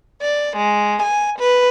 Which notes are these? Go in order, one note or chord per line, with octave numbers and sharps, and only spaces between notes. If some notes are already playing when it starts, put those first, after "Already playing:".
D5
G#3
G#5
B4